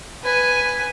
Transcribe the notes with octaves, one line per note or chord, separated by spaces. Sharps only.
B4 G#5